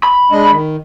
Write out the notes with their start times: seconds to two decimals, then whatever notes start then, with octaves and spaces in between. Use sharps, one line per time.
0.03 B5
0.31 G#3 D4 D#5
0.52 D#3